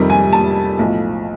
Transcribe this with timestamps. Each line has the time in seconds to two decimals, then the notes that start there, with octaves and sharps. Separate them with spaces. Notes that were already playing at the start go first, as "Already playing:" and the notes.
Already playing: F2 C3 D#3 G3
0.10 G#5
0.33 A5
0.79 B1 A2 F3